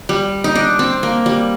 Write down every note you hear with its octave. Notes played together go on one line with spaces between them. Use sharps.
G3
D#4
D4
C4
A#3
G3